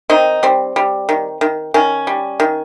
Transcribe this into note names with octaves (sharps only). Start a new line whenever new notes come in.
D#3 C4 D#4
G3 C4
G3
D#3
D#3
D#3 C#4
G3
D#3